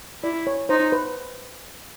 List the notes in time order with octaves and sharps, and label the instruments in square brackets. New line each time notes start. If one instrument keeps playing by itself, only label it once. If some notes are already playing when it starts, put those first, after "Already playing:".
[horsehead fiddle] E4 [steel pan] D5
[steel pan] C#5
[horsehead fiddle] D#4 [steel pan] C5
[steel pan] B4